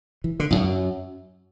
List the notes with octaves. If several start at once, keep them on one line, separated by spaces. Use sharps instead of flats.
E3
D3
E2
F#2